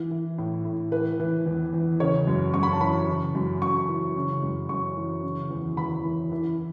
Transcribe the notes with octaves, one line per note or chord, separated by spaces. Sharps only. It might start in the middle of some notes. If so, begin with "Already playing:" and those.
Already playing: E3
E3
A2
A2
E3 B4
E3
E2
E2
C#3 C#5
F#2
F#2 C#6
B5
A5
E3 B5
C#3
F#2
F#2 C#6
E3
C#3
F#2
F#2 C#6
E3
C#3
E2
E2 B5
E3
E3